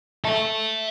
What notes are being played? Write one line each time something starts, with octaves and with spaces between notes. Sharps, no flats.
E5 A5